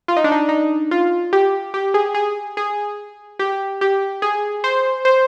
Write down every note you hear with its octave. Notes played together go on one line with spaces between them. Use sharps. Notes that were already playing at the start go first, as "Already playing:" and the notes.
F4
D#4
D4
D#4
D#4
F4
G4
G4
G#4
G#4
G#4
G4
G4
G#4
C5
C5